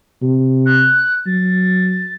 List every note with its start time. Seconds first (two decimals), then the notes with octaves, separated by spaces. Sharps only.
0.22 C3
0.66 F#6
1.26 F#3 A6